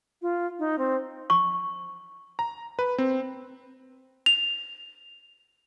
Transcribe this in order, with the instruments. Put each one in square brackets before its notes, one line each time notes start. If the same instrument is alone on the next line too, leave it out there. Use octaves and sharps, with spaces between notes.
[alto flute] F4
D#4
C4
[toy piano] C#6
[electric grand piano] A#5
B4
C4
[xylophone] F7